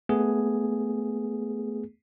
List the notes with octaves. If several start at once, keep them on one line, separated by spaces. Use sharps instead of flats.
A3 B3 G#4